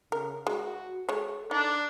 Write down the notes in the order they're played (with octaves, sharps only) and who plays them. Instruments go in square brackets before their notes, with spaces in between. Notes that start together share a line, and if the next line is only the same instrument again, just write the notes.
[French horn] C#3 [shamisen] A#4
[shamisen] G#3 [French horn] F#4
[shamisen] G#3 C#5 [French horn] A4
[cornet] D4 [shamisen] D#4